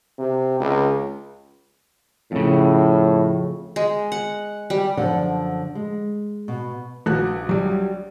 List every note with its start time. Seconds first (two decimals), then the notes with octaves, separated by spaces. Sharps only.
0.18 C3
0.60 C#2
2.32 F2 A2 C#3
3.76 G#3
4.12 F#5
4.70 G3
4.97 F#2 D3 F3 D5 F#5
5.75 G#3
6.48 B2
7.06 A#1 F#4 F#6
7.49 F#3 G3